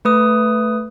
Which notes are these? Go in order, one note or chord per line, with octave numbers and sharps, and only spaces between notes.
A3 B4 D#6